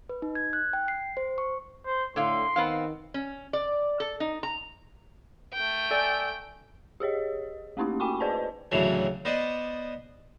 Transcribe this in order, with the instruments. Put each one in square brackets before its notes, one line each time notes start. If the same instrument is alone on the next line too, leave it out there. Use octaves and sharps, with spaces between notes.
[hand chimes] B4
D#4
G#6
F#6
G5
C7
C5
C#6
[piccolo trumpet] C5
[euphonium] A2 [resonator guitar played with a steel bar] D3 F5 [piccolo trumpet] C6
[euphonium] D#3 [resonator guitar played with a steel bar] B3 C4 F5
[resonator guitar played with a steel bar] C#4
D5
A4
D#4
A#5
[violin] A3 G5
[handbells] A4 D5 G#5
[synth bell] G4 G#4 C#5 D#5
A3 A#3 C#4 D#4 E4 G4
F#4 G5 G#5 B5 C#6 D6
G#4 B4 C5 D5 D#5 A5
[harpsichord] D2 A2 C#3 E3 F#3
B3 C5 D5 D#5